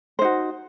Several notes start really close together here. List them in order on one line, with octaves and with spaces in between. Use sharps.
C5 D#4 F#4